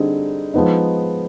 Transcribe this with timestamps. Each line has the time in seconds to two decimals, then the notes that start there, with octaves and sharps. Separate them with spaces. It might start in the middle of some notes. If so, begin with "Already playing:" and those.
Already playing: D3 G3 C4 D#4 G#4
0.54 F3 G#3 B3 D#4